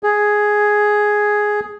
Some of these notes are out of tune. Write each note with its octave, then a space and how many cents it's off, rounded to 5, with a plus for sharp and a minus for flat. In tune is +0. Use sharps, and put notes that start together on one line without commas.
G#4 +5